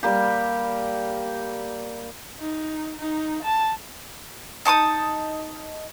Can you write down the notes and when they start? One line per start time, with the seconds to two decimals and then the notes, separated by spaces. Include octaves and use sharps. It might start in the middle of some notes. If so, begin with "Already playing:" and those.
0.03 G3 A#3 G4
2.39 D#4
2.99 D#4
3.43 A5
4.65 D#4 A5 C#6 D#6